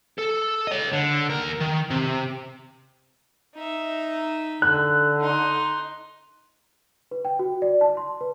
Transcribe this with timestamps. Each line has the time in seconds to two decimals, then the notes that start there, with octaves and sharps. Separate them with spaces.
0.19 A4
0.67 C#5 D#5
0.92 D3
1.30 D#2 A#4
1.61 D#3
1.91 C3
3.55 D#4 E5
4.62 D3 F#6
5.20 D#4 C6
7.11 B4
7.25 G5
7.39 F#4
7.62 D5
7.81 A5
7.97 C6
8.21 B4